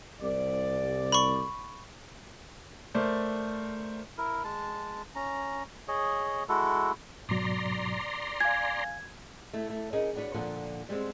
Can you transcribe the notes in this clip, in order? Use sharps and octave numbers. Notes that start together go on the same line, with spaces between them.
C2 D5
B5 C#6
A3 A#4 C5 D5
E4 A#4
G#3 A5
C#4 A#5
G#4 C#5 D#5
G#3 E4 F#4 A4
G#2 B2 F#3 D5 A#5 C6
F5 G#5 G#6
A3 E4
A3
C#4 D#4 G#4 A#4 D#5
B3 D4 F#4 B4 C#5
A#2 D3 F3 F#5
G3 G#3 B3 C4